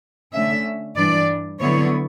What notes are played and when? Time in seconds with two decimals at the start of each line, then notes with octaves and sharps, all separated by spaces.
0.33 D3 A3 C#4 E5
0.96 G2 E3 G3 D4 D5
1.59 D3 F#3 B3 E4 C#5